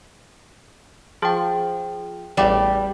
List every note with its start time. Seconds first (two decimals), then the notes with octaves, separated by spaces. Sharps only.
1.22 F3 G#4 G5
2.37 A1 E2 G3 D5 G5 D6